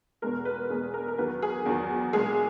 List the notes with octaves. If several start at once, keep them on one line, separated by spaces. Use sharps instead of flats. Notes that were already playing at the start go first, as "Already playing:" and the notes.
E2 B2 G#3 A#4
B4
E2 B2 G#3 G#4
A#4
A#4
E2 D#3 F#3 B4
G#4
E2 D#3 F#3
A#2 G#3 G#4